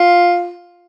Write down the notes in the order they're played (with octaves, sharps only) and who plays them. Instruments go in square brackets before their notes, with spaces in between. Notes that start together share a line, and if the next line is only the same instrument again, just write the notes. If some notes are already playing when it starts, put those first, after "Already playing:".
Already playing: [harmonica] F4